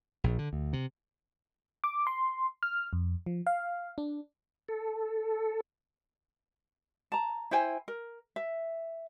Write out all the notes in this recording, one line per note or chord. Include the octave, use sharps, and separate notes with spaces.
A#1
D3
D2
C3
D6
C6
F6
F2
F3
F5
D4
A4
A5 A#5
E4 C5 G5 G#5
A#4
E5